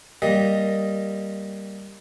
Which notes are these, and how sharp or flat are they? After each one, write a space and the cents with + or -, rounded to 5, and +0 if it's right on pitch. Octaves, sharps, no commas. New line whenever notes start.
G3 +0 A#3 +0 D#5 +5